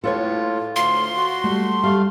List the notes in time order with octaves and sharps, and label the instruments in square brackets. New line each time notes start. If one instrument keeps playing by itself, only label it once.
[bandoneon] A2 F4 [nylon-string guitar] A4 B4 C#5
[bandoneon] D2 F4 [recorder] C6
[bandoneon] F#4
[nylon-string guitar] G3 A3
[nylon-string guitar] G3 [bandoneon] A3 F5